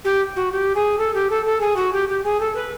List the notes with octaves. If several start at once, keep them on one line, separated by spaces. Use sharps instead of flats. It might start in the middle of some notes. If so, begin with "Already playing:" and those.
G4
F#4
G4
G#4
A4
G4
A4
A4
G#4
F#4
G4
G4
G#4
A4
B4